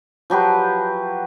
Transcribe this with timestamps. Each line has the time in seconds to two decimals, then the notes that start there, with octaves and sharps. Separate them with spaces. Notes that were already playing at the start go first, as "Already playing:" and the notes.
0.30 F3 F#3 G4 B4